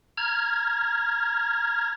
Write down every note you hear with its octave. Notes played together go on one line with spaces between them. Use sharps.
A#5 F6 G#6